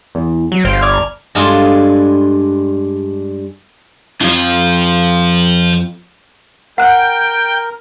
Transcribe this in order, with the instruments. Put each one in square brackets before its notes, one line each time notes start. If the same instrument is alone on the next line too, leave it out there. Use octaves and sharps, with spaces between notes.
[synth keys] E2
[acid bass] F#3
[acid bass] G1 [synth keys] C5 F5 G5
[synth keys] D5 F6 G#6
[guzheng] G2 G#3 D4 F4 G#4 A4
[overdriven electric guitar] F2 [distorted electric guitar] F3
[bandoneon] A#4 [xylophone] F#5 F#6 [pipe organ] G5